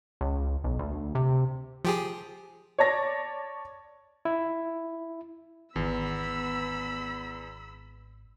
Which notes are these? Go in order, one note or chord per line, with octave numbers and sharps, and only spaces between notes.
C#2
B1
D2
C3
F3 G4 G#4
C#5 D5 A5 A#6
E4
G#1 E2 B3 B5 E6